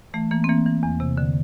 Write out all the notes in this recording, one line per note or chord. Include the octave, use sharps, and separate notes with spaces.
E3 A3
E3 A#3
C4
E3 A#3
E3
E2
C3
D3